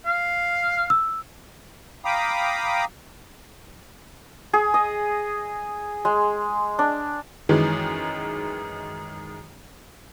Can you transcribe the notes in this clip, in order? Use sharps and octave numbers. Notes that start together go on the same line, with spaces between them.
F5
E6
F5 G5 A#5 B5 D6 D#6
G#4
D#5
G#3
D4
F#2 D#3 E3 G#3